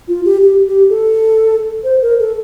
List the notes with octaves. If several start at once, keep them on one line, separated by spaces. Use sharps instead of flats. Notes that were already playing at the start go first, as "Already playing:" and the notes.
F4
G4
G4
G4
A4
C5
A#4
A4